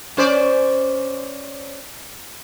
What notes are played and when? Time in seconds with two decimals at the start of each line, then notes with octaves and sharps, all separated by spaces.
0.17 C#4 C5 D5